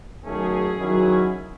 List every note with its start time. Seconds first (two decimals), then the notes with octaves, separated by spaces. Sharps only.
0.25 D#3 F#3 A3 C#4 G#4
0.79 D#3 F#3 C#4 E4